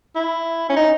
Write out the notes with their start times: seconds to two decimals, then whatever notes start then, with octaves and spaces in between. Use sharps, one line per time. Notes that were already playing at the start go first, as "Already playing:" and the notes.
0.15 E4
0.69 C#4
0.76 D#4